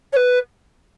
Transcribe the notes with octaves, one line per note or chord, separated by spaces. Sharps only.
C#5
B4